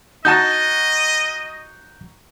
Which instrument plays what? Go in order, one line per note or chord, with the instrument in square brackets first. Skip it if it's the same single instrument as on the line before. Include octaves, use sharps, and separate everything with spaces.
[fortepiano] D#4 F#4 A5 [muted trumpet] D#5 [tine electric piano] G6